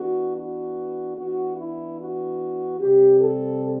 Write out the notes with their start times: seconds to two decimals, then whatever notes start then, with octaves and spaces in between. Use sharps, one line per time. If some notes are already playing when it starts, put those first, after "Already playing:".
Already playing: E3 B3 D4 F#4
0.35 F#4
1.16 E3 B3 D4 F#4
1.57 E4
1.98 F#4
2.79 C3 G3 C4 G4
3.20 A4